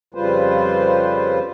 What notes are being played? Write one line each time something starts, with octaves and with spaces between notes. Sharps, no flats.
F2 C#3 G3 F4 B4 C5